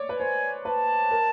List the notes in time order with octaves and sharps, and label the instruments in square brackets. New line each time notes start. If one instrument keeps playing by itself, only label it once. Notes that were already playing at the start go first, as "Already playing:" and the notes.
Already playing: [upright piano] C#5 D5
B4
[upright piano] C5 [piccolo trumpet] G#5
[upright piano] B4 [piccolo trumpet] A5
[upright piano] A#4